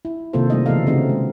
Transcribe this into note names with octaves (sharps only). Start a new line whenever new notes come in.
E4
C3 D#3 A#3 F4 A4 C5
G3 A3 A#3 D#4 D#5
C#3 E3 A3 B3 A4 F5
C#3 A3 C4 D#4 F#4
G#3